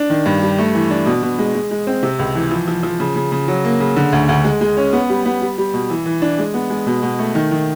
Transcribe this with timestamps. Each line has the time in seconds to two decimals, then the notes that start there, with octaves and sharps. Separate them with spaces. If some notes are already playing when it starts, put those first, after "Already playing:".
Already playing: D4
0.10 D#3
0.26 G2
0.42 G3
0.58 A3
0.75 E3
0.91 D4
1.06 B2
1.23 B2
1.39 G#3
1.55 G#3
1.71 G#3
1.87 C4
2.03 C3
2.19 C#2
2.35 E3
2.51 F3
2.68 F3
2.83 F3
3.00 C#3
3.16 C#3
3.32 C#3
3.48 F#3
3.65 A#3
3.80 C#3
3.96 D3
4.12 D2
4.29 D2
4.44 G#3
4.61 G#3
4.77 C#4
4.93 B3
5.09 G3
5.25 B3
5.42 G3
5.58 G3
5.74 B2
5.90 E3
6.06 E3
6.22 D4
6.38 G#3
6.54 B3
6.70 G#3
6.87 B2
7.03 B2
7.19 A3
7.35 D#3
7.51 D#3